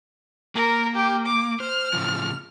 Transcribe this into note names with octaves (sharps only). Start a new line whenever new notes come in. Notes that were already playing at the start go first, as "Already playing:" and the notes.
A#3 A#4
G4
D6
C5 F6
A2 C#3 F3